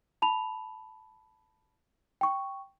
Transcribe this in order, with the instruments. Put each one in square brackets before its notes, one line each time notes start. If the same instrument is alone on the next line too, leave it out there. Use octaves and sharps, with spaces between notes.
[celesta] A5 B5 F7
G5 C#6